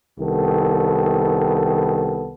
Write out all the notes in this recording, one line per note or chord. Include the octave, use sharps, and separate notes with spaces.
C2 D#3 B3 A4